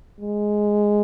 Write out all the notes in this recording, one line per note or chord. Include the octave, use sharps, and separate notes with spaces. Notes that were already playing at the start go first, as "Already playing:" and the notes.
G#3